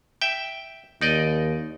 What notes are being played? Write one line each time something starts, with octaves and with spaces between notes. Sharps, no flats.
E5 G5
D#2 D#4 D5 D#5